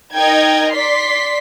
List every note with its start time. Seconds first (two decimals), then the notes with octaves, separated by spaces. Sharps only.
0.14 D#4 A#4 D#5 G5 G#6
0.72 D5 C6 B6